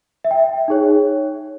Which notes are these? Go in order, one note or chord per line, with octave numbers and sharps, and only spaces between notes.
E5
G5
D#4 G#4 C#5